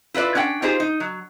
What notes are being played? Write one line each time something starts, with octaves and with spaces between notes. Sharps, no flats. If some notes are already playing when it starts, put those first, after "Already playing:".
E4 F4 B4 D5 E5
C#4 D4 F#5 G5
D#4 F4 G4 G#4 C5
D#4
F#3